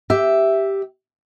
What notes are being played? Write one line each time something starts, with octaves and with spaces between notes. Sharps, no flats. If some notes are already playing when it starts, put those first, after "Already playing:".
G4 E5